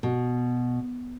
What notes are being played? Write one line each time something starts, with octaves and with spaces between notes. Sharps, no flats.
B2